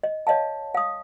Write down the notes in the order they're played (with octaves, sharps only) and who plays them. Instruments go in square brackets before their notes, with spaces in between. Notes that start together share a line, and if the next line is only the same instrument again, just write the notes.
[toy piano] D#5
C#5 D#5 F5 A5
F5 D#6